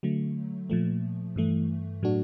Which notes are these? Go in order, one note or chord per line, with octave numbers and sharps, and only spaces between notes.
D3 F#3 A3
A#2 F3 A3
G2 E3 A3
A2 F#3 A3 D4 F#4